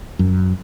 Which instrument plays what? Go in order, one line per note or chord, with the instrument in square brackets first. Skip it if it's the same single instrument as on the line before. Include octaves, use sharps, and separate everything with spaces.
[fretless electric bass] F#2